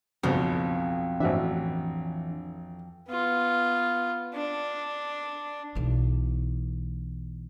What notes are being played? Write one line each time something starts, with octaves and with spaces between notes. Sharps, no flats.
B1 F2 C#3
A1 E3 D4 F#4 E5
B3 F4
D4
B1 E3